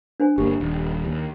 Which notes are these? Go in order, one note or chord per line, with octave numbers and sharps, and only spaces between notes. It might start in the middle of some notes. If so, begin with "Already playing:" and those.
D4 C5 G#5
G1 A#3 G4
D#1
D#2